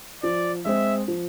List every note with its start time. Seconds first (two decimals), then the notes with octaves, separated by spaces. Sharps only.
0.23 F3 D5
0.65 G#3 C4 E5
1.08 F3